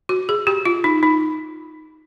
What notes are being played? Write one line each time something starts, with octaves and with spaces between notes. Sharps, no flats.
F#4
G#4
G4
F4
D#4
D#4